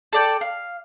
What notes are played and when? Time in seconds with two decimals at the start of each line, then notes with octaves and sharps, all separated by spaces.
0.13 A4 D5 G5
0.41 F5